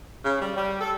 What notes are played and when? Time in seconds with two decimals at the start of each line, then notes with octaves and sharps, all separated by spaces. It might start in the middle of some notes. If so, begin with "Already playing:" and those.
0.25 C#3
0.41 G3
0.57 G3
0.81 A4